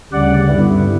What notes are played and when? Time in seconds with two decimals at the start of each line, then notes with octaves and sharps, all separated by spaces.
0.12 D2 C#3 G3 D5 F#5
0.48 G2 D3 G3 B3 E4